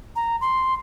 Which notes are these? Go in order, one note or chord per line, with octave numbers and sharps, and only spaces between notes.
A#5
C6